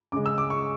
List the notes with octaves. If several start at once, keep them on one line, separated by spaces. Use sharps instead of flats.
C#3 G#3 D6
E6
D6
C#6